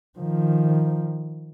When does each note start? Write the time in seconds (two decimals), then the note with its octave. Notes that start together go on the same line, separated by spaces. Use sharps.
0.19 D#3 F3